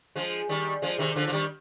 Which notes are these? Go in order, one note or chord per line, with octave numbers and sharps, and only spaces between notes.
F3 G#3
D#3 G3
F3 G#3
C3 D#3
D3 F3
F3
D#3 G3